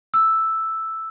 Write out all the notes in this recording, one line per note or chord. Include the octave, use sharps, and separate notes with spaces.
E6